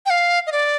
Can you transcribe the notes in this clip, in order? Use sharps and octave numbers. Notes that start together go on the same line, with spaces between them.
G5
F5
D#5
D5